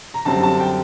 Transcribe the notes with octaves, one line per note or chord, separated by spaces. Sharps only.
A#5
F#2 D3 G3 C4 A5
A5
G5